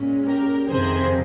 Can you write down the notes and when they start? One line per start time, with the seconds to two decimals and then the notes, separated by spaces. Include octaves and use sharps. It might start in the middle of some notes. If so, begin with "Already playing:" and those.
Already playing: A#2 G#3 C#4
0.25 G4 A#4
0.68 F2 C3 D#3 G#4 C5